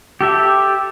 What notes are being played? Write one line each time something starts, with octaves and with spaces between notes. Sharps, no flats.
G4 A4 E5